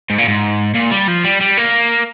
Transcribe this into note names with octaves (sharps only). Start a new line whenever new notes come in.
G#2
A#2
G#2
A#2
G3
F3
G3
G3
A#3